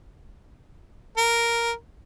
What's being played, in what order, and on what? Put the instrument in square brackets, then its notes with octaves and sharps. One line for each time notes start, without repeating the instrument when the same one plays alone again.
[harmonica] A#4